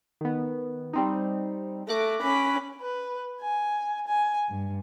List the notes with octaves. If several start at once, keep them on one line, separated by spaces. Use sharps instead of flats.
D#3 B3
G3 C4 D#4
A3 D6 F#6 A#6
C#4 B5
B4
G#5
G#5
G2